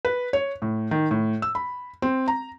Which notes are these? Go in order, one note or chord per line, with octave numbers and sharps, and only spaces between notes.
B4
C#5
A2
D#3
A2
E6
B5
C4
A#5